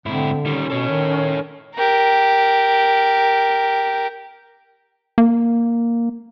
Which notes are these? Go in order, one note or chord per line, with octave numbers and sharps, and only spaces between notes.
G#2 D3 C4 E4
D#3 G3 C#4
B2 A4 C#5
D#3
G4 A#4
A#3